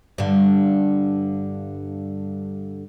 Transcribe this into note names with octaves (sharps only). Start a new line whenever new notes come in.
G2 D3